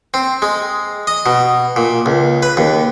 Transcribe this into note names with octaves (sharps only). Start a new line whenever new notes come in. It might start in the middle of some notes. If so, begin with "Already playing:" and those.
C4
G#3
D#5
B2
A#2
C#2
B4
D#2